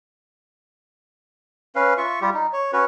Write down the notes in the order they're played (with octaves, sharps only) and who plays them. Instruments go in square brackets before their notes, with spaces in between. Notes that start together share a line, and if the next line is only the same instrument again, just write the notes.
[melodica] C#4 B4 F5
F4 E5 C#6
G3 F4 G4
D#4
C#5
C#4 F#4 B4 C#5